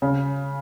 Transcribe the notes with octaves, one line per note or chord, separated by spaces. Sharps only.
C#3